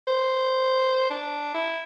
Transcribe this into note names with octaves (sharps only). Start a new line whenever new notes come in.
C5
D4
E4